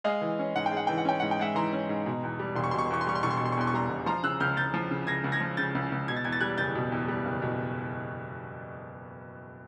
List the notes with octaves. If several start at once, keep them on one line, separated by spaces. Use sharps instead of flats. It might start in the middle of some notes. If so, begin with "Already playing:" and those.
G#3 D#5 F5
E3
C#4
G#2 F#5
G5
G#3
F#5
E3 G5
F#5
C#4 G5
G#2 F#5
G5
G#3 E5 F#5
E3 A#5 C6
C#4
G#2
B2
E2
G3
E1 C6
C#6
B2 C6
C#6
C6
E2 C#6
C6
G3 C#6
C6
E1 C#6
C6
C#6
B2
C6
C#6
E2 C6
C#6
G3 A#5 C6
E1
F3 A#5 C6
C#3 E6 F#6
C#2 F6 G6
C#2 G6 A6
F3
C#3
C#2 G#6 A#6
C#2
G#6 A#6
F3
C#3 G6 A6
C#2
C#2
B2 G#6
A6
E2 G#6
A6
G3 F#6 G#6
F#1 G6 A6
B2
E2
G3
F#1
B2